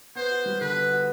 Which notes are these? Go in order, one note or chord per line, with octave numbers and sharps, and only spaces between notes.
B3 C5
F#4
G3
D3 B4
B3
F#4